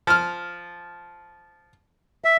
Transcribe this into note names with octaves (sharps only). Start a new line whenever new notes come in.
F3 F6
E5